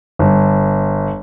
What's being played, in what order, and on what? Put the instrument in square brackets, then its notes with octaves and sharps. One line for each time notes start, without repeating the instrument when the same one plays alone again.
[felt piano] G1